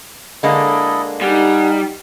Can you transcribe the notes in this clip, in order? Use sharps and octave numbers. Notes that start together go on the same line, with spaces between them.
D3 G#3 A#3 E4 A4 D#5
G3 D#4 F#5 G#5